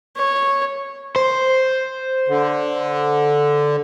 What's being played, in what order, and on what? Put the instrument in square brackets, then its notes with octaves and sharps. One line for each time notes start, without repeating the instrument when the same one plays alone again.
[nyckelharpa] C#5
[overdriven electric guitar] C5
[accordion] D3